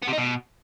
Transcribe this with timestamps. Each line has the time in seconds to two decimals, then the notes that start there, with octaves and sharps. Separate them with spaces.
0.03 B3
0.08 C3
0.13 D#4
0.18 B2